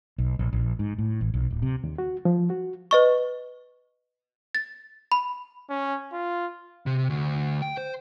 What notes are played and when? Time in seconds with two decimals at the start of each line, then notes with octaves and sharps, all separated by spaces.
0.18 B1
0.39 A#1
0.53 A#1
0.79 G#2
0.98 A2
1.21 A1
1.34 B1
1.51 D1
1.62 C3
1.84 D#2
1.98 F#4
2.25 F3
2.50 F#4
2.91 B4 D#5 C#6
4.55 A6
5.12 B5
5.70 C#4
6.13 F4
6.86 C3
7.10 D2
7.62 G5
7.77 C5